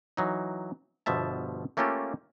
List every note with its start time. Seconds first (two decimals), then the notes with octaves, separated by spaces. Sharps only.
0.17 E3 F#3 D#4
1.06 G1 B2 F3 E5 A5
1.77 A3 A#3 C#4 F4 G4 A4